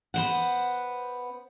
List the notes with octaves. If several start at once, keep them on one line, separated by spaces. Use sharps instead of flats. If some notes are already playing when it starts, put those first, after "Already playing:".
B3 C5 F#5